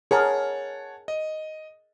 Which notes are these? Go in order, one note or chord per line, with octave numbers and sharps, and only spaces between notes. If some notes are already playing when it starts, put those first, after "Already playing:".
G#4 A#4 C#5 F#5 A5
D#5